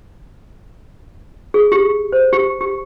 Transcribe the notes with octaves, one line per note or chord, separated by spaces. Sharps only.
G#4
G4
C5
G4
G4